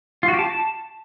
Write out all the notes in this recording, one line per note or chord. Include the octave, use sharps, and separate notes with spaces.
F4
F#4
G4
A5